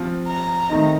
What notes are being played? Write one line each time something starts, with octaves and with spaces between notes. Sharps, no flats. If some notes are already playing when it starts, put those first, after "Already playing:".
Already playing: F3 C4 F4
A#5
D#3 A3 C4 D#4